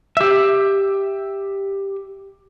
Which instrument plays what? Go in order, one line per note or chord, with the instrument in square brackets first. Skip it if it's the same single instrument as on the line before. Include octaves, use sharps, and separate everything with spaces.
[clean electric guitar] G4 E5